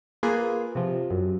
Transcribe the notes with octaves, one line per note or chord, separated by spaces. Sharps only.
A#3 F4 G#4 B4
C3 F3
F#2